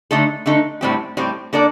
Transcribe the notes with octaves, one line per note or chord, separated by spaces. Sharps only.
D3 A3 D#4 A4
D3 A3 D#4 A4
A2 G3 C4 G4
A2 G3 C4 G4
A#3 D4 A4 D5